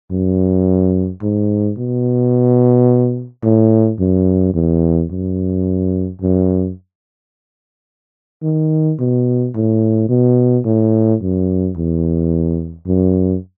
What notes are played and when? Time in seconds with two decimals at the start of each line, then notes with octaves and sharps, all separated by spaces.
0.11 F#2
1.22 G#2
1.78 B2
3.43 A2
4.00 F#2
4.54 E2
5.11 F#2
6.21 F#2
8.43 D#3
8.99 B2
9.55 A2
10.09 B2
10.65 A2
11.21 F#2
11.76 E2
12.87 F#2